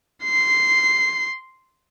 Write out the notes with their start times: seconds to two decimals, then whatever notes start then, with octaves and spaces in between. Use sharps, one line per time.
0.24 C6 C7